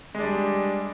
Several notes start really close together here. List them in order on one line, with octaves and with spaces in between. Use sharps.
G#3 D4 G3